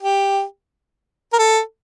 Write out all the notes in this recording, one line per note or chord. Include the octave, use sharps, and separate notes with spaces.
G4
A#4
A4